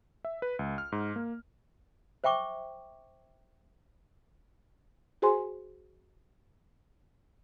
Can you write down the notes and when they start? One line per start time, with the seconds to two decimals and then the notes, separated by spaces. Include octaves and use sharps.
0.25 E5
0.42 B4
0.59 C#2
0.78 F6
0.92 G#2
1.16 A#3
2.24 C5 E5 G5 C#6 D6
5.22 F#4 G#4 C5 G#5 C6